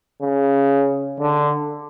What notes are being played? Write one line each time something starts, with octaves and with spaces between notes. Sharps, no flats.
C#3
D3